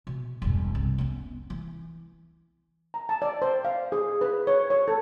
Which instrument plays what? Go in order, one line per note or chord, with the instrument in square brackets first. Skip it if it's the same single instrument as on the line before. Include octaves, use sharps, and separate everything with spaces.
[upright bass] B2
E1 G2
C2
B3 C#4
E3
[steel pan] A#5
A5
D5
C5
F5
G#4
B4
C#5
C#5
A4